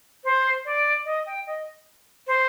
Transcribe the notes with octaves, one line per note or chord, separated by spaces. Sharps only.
C5
D5
D#5
G5
D#5
C5